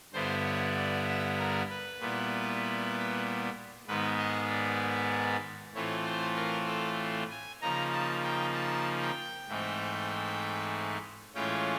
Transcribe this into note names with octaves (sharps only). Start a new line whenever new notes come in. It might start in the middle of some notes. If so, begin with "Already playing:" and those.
G2 D3 G3 B3 E4 C5
C#5
D5
E5
A#4
B4
A#2 G3 B3 E4
G#2 D#3 G#3 B3 B4
D#5
D5
A2 E3 A3 C4 F4 C#5
C5
A#4
A4
G#5
C#3 F3 A#3 D#4 A#5
A5
G5
A5
G5
G#2 E3 A3 C4 D#4
A2 E3 G#3 C#4 F4 G5